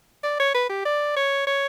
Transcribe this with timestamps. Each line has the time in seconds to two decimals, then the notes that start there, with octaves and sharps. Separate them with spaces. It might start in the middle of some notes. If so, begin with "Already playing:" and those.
0.24 D5
0.40 C#5
0.54 B4
0.69 G4
0.85 D5
1.17 C#5
1.47 C#5